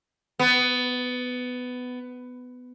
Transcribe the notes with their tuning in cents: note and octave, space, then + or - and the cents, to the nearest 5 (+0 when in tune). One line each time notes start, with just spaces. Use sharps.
B3 +15